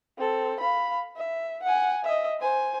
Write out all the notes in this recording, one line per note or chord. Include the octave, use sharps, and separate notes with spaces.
C4 A4
F5 B5
E5
F#5 G#5
D#5 E5
C5 G#5